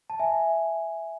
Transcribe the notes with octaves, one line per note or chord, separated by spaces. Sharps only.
A5
E5 G#5